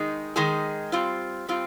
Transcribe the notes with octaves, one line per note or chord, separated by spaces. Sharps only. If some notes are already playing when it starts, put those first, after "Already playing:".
Already playing: D#3 G#3 D#4 G#4
D#3 G#3 D#4 G#4
G3 C4 F4
G3 C4 F4